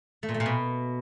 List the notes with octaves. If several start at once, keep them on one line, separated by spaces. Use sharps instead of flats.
A3
A#2
A3
A#2
B2